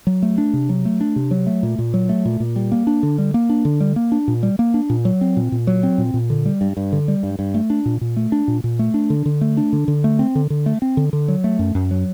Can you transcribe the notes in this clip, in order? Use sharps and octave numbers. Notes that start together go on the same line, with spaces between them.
F#3
A3
D4
C3
F#3
A3
D4
C3
F#3
A3
A#2
A#2
F#3
A3
A#2
A#2
G3
A#3
D4
D3
G3
A#3
D4
D3
G3
A#3
D4
A#2
G3
A#3
D4
A#2
F#3
C4
A#2
A#2
F#3
C4
A#2
A#2
D3
G3
G2
G2
D3
G3
G2
G2
A3
D4
A#2
A#2
A3
D4
A#2
A#2
A3
D4
D3
D3
A3
D4
D3
D3
A3
C4
D3
D3
A3
C4
D3
D3
F#3
A3
F#2
F#2
F#3